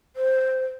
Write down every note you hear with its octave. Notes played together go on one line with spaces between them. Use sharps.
C5